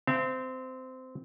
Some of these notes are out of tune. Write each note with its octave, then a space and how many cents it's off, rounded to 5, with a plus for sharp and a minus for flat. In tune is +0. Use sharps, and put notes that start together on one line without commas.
C4 -20 E5 +40